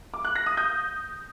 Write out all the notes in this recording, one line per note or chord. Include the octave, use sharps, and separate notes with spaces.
D6
F#6
A#6
D#6
G6